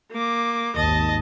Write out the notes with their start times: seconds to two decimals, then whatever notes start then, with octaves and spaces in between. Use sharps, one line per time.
0.11 A#3 D6
0.76 G#1 D#2 D#5 A5